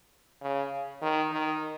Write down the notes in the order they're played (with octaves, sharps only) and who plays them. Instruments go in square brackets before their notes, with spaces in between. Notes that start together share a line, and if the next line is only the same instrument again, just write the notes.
[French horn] C#3
D#3
D#3